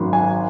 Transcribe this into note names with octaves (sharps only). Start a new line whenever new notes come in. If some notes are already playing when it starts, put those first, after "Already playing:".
Already playing: G#1 F#2 D#3 F#3
G#5